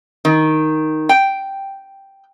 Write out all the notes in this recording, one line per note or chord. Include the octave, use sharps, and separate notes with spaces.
D#3
G5